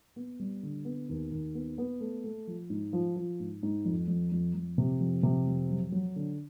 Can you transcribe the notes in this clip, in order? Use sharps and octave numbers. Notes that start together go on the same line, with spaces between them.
B3
G3
D3
B3
D#2
D#2
B3
B3
A3
A3
F3
G#2
F3
F3
G#2
G#2
F2
F2
F2
F2
C3
F2
C3
F2
F#3
F#3
D3